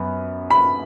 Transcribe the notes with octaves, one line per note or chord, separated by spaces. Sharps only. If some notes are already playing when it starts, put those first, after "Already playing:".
Already playing: F#2 B3
B5